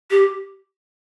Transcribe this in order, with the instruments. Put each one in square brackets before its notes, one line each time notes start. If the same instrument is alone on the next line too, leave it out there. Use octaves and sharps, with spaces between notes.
[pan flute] G4